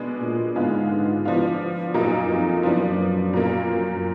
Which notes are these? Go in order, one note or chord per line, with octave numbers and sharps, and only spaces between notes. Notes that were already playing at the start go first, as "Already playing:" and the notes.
Already playing: B2 G#3 B3 D4
A#2
G#2 D3 G#3 B3 F4
F3 B3 D4 F4
F#2 A#2 F#3 A#3 D#4
F2
F#2 F3 B3 D4
A#2 F#3 A#3
F#2